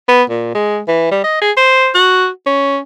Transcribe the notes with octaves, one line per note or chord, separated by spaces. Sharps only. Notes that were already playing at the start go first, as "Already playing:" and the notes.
B3
A#2
G#3
E3
G3
D#5
G#4
C5
F#4
C#4